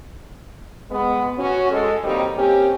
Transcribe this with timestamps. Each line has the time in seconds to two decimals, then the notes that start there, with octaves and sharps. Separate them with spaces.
0.91 G#3 B3
1.38 C#4 F#4
1.71 G#3 A4
2.03 D#3 F#3 G3 A#3 C4 D#4
2.37 A#3 C4 C#4 G4